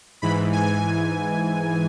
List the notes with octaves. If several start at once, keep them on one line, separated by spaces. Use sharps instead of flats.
G#2 E3 B5
G#5